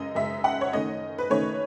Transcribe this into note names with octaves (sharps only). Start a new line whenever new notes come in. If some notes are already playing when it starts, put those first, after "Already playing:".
Already playing: F#2 C#3 G#3 D#5
F#2 C#3 G#3 E5
F#5
C#5
D#3 A3 C#4 D#5
B4
D#3 A3 C#4 C#5